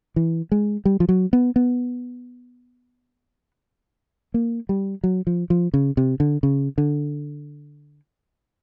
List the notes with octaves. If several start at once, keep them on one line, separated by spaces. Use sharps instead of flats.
E3
G#3
G3
F3
F#3
B3
B3
A#3
G3
F#3
F3
F3
C#3
C3
D3
C#3
D3